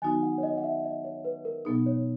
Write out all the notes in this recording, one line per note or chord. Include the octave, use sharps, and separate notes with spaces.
D#3 F#3 B3 D#4 F#4 G#5
F#5
C#5
D#5
F#5
E5
D#5
C#5
B4
A#4
B2 F#3 B3 D#4 G#4
C#5